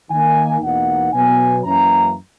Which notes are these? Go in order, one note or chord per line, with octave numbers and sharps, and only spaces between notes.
D#3 A#3 D#4 G#5
E2 B2 A#3 D#4 F#5
B2 F#3 B3 G#5
F#2 E3 A#3 C#4 A#5